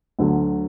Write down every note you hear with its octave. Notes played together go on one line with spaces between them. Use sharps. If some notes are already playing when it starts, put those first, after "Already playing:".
D2 D3 F#3